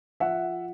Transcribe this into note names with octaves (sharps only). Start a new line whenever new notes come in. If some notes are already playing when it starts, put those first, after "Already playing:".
F3 E5 F#5